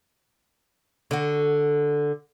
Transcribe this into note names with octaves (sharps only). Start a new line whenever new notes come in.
D3 F#4